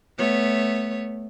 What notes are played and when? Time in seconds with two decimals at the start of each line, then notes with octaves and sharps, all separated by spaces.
0.18 A3 B3 C#5